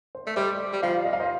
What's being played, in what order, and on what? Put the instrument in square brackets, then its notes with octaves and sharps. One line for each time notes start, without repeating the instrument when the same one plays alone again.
[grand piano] C5
[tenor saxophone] A3 [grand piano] D5
[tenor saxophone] G3 [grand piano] C5 D#5
[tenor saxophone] G3
[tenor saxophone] F3 [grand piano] D5 F5
[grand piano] D#5
F5
C5 D#5